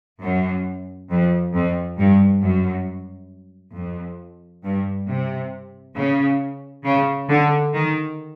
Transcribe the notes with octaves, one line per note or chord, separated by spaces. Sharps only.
F#2
F2
F2
G2
F#2
F2
G2
C3
C#3
C#3
D3
D#3